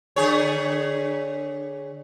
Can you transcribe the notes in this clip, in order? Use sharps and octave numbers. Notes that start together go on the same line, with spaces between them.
D3 G#4 C#5